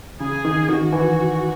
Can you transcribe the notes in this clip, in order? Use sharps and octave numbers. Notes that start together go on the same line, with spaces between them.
C#3 G#4
D#3
D#3 F#4
E3